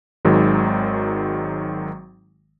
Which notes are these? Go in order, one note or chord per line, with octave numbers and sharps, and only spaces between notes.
G#1 D#3 F#3 G#3